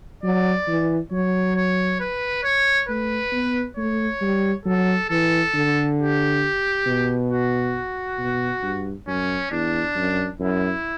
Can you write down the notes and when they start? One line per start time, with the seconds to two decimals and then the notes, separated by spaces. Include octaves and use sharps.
0.24 F#3 D5
0.68 E3
1.12 F#3 C#5
1.57 C#5
2.00 B4
2.44 C#5
2.89 A3 B4
3.32 B3
3.77 A3 C#5
4.21 G3
4.66 F#3 A4
5.09 E3 A4
5.54 D3
5.98 G4
6.87 B2
7.31 F#4
8.19 B2
8.63 G2
9.07 F#2 C#4
9.51 E2 D4
9.96 F#2
10.40 F#2 E4